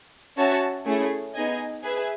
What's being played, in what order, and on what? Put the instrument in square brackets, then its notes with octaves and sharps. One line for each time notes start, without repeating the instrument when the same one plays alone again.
[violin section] C#4 F#4 C#5 E5 A5
A3 C#4 E4 G#4
B3 D#4 G#4 D#5 G#5
G#4 B4 E5 G#5